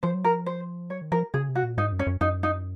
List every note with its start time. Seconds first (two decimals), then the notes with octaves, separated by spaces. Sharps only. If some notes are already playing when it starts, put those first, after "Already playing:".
0.03 F3 C5
0.14 F#3
0.25 F3 A#4
0.46 C5
0.90 F#3 C#5
1.01 D#3
1.12 F3 A#4
1.34 C#3 G#4
1.49 C3
1.55 F#4
1.63 A#2
1.77 G#2 D#4
1.92 F#2
1.99 C#4
2.07 F#2
2.21 F#2 D#4
2.43 D#4